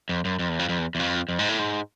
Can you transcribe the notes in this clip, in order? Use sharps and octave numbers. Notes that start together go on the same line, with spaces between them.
F2
F#2
F2
E2
F2
F2
E2
E2
F2
F2
G#2
A2
G#2